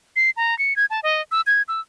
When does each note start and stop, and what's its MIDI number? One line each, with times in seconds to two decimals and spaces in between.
0.16 0.30 96
0.37 0.57 82
0.59 0.76 97
0.76 0.86 92
0.90 1.00 81
1.03 1.22 75
1.32 1.41 88
1.47 1.62 92
1.68 1.80 88